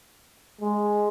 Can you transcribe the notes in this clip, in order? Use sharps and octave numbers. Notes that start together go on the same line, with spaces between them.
G#3